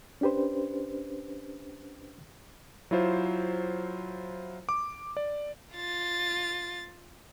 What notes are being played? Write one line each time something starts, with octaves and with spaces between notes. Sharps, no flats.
C#4 D4 G4 B4 C5
F#3 E4 F4 C5
D6
D5
F4 A6